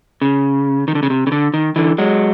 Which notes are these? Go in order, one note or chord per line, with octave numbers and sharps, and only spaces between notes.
C#3
D#3
D3
C#3
C3
C#3
D3
D#3
D3 E3
F#3 G#3